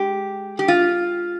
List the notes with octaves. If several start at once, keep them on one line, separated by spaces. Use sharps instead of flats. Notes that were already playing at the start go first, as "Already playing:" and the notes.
Already playing: G#3 G4
G4
F4